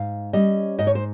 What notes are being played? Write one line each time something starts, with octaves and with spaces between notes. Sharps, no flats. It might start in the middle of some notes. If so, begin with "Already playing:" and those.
Already playing: G#2 F5
G3 C#4 D#5
G#2 D#5
C#5
C5